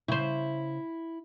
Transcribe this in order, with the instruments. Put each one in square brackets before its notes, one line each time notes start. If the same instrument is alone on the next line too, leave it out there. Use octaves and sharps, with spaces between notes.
[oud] C#3 C5 [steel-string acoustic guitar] E4